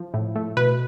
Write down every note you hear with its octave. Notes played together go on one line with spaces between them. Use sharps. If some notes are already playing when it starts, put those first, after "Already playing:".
Already playing: F3
A2
A3
B2 B4